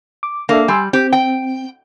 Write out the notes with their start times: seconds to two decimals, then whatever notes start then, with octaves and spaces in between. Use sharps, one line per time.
0.23 D6
0.49 A#3 D4 A4 E5
0.68 G3 G#5 C6 E6
0.93 C4 G4
1.13 G5